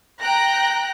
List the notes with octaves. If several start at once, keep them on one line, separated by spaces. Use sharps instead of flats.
G5 A#5 F#6 A#6